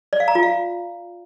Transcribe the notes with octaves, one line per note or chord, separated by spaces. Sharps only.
D5
F5
A#5
F4
F5